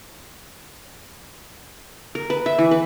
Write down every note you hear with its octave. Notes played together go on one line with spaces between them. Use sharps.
A#4
B4
E5
E3
B4